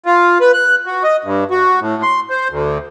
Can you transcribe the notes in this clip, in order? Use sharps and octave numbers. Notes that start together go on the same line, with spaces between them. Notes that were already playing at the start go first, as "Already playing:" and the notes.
F4
B4
F#6
F#4
D#5
G2
F#4
A2
C6
C5
D2